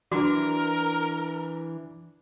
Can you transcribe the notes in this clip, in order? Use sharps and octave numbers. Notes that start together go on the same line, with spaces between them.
E3 D4 F#4 A#4 D6